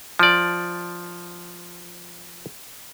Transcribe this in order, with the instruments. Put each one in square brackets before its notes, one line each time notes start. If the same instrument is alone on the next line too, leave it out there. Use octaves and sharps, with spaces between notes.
[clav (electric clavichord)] F3 D5